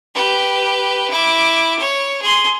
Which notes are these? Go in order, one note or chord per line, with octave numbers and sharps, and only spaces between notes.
G4 B4
E4 D6
C#5
G#4 C6